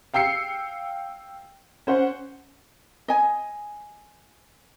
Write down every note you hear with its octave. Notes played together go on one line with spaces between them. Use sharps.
F5 G5 E6 C7 C#7
C#4 C5 F#5
D#5 G#5